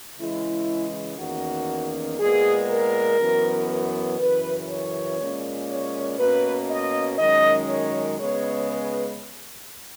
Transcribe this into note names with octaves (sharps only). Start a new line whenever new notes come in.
C#3 E3 G#3 E4
E2 D#3 A#3 C#4 F#4
A#2 G#3 B3 G#4
A#4
F#2 E3 B3
F#2 C#3 E3 B4
C#5
A#2 G#3 C#4
C#5
B2 A#3 C#4 B4
D#5
F#2 D#3 G#3 C#4 D#5
C#5
C#3 G#3 B3 C#5
B4